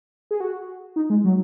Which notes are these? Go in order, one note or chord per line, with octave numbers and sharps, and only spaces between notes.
G#4
F#4
D#4
G#3
F#3